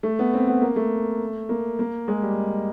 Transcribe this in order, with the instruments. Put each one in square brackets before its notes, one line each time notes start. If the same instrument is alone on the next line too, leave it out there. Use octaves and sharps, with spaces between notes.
[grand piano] A3
B3
C4
B3
A#3
A3
A#3
A#3
G#3
G3